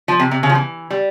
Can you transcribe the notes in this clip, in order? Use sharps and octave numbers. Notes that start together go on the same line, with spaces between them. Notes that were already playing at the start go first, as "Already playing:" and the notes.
F3
C3
C3
C#3
F3
E3
G3